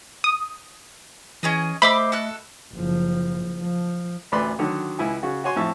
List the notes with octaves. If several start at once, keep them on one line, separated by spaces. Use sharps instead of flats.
D#6
E3 C#4 G#4 D#5
A3 C5 D#5 E5 B5 D6 E6
F#4 A4 F#6
F#1 F3
F3
A1 D2 B4 D5 B5 C6
D3 D#3 F#3
C#2 E4 G#5
C#3 F#4
F#4 C#5 G#5 C6
F2 A2 E5 A5 C#6